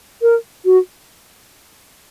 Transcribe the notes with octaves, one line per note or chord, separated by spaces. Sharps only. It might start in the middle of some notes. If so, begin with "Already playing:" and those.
A#4
F#4